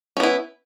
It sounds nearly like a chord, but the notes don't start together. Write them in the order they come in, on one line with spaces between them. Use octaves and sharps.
C#4 B3 E4